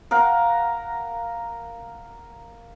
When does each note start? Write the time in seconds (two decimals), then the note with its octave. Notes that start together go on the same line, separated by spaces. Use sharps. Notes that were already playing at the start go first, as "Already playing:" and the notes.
0.11 A#4 F5 F#5